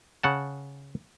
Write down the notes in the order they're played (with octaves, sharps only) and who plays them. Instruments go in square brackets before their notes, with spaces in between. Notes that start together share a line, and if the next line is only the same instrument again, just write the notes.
[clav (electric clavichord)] C#3 F#5 A5